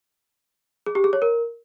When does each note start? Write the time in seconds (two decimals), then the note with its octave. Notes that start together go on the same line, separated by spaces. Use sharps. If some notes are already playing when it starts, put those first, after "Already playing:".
0.86 G#4
0.95 G4
1.04 G#4
1.13 C#5
1.22 A#4